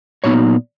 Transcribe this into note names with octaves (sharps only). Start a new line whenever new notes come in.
A#2 F#3 B3 D#4 C#5